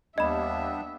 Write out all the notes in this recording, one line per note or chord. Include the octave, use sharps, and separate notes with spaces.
D#2 G3 B3 D4 D#5 E5 B5